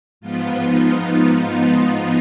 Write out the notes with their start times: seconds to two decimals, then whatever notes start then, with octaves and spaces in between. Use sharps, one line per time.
0.21 G#2 F3 B3 F4
0.60 D#4